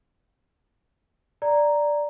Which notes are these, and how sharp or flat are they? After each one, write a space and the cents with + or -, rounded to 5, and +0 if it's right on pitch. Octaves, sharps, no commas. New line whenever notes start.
D5 +0 A#5 +0